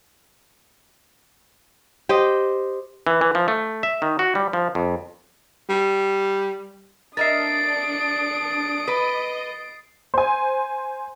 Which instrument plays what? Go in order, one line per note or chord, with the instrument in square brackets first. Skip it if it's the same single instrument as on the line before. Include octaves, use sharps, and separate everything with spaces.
[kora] G4 C5 D#5
[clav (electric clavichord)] E3
E3
F3
A3
E5
D#3
F#4
G3
F3
F2
[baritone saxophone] G3
[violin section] D4 [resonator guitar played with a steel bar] A#4 D#5 E5 [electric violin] D#6 D7 [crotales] A6 C7
[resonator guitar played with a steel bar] B4 [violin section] D#5
[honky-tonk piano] C5 G#5